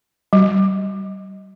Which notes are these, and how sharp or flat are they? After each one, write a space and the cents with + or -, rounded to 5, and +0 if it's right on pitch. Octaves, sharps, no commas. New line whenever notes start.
G3 -30